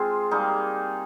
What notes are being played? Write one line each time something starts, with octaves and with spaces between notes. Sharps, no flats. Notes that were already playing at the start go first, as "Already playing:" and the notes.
Already playing: G#3 C4 F4 G#4
G3 A#3 D#4 G#4